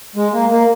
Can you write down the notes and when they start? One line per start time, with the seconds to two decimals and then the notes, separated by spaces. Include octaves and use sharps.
0.16 G#3
0.33 A#3
0.51 A#3